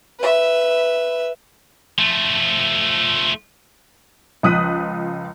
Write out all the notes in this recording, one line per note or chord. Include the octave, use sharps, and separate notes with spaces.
B4 E5
F3 A3
C#2 F3 D#6 F#6 B6 D#7